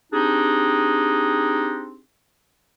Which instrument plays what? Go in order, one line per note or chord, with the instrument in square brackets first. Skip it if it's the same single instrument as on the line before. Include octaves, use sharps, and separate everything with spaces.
[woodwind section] C4 D4 D#4 G4 G#4